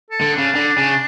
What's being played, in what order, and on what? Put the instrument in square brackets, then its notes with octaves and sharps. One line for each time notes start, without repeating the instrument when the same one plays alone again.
[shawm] A4
[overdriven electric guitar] D3
[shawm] D4
[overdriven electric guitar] C#3
D3
C#3